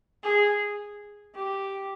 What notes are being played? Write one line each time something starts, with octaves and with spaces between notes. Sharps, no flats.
G#4
G4